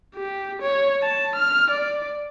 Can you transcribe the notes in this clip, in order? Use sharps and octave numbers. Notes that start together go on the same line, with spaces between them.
G4
C#5
A5
F6
D5